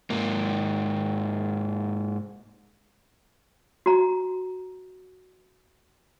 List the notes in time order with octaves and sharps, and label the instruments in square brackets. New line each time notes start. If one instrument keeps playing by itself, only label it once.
[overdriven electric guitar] G#2 A#3
[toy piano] F#4 A#5